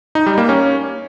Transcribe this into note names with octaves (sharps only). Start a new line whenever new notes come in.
D#4
G3
A#3
C#4